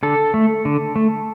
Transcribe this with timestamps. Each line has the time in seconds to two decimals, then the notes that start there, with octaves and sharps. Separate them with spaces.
0.03 D3 A4
0.34 A3
0.65 D3
0.96 A3